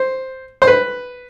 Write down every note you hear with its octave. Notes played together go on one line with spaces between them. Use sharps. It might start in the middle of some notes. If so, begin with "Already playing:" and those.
Already playing: C5
C5
B4